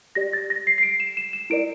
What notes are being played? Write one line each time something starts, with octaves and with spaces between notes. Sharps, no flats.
G4 D5 A#6
A6
A#6
C7
C7
D7
E7
E7
E7
E4 A#4 D5 D7